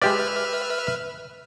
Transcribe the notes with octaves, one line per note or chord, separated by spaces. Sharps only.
G#3 G4 B4 D5 E5 F6